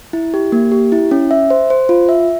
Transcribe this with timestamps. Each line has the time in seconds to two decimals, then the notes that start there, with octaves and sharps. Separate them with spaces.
0.13 E4
0.34 G4
0.52 A#3
0.72 G4
0.92 E4
1.11 C#4
1.31 E5
1.50 C5
1.70 C5
1.89 F4
2.09 E5